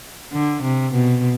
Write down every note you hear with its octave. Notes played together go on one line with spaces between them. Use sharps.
D3
C3
B2